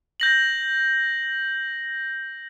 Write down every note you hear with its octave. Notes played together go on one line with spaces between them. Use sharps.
G6 A#6 F#7